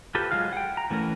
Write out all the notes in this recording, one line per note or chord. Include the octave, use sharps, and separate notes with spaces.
F4 G4 A4 B4 C5
F#3 G#3 F4 F5 F6
F#5 G5
A#5
E3 A3 C#4 A#4